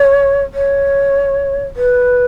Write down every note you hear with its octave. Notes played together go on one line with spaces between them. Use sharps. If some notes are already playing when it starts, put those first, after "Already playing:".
Already playing: C#5
C#5
B4